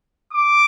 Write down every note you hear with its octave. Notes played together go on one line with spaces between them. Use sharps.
D6